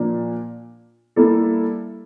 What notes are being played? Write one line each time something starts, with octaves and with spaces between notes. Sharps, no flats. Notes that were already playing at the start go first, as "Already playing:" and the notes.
Already playing: A#2 F3 A#3 D4
G3 A#3 E4 A4